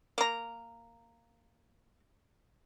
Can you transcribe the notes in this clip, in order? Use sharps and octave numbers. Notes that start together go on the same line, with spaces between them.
A#3 A#5